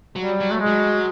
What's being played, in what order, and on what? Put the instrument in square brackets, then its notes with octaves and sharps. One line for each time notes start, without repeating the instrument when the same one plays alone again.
[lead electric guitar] F#3 [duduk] G3
[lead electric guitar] F#3
[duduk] A3
G#3
[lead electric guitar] F#3